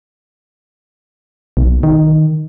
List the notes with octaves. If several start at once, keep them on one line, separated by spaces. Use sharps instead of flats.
B1
D#3